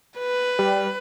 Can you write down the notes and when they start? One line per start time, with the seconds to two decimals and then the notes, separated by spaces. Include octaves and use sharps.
0.19 B4
0.59 G3